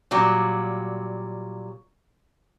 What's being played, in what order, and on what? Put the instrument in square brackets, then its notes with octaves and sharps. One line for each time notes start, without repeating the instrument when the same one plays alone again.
[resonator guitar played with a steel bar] A#2 F#3 G3